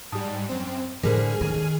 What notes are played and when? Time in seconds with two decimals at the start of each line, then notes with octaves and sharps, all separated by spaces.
0.12 G#2 G3 A5 D#6
0.49 F#2 C4
1.03 A2 D3 G3 G#4 A#4 C5 F6
1.41 D#2 D#3 G#5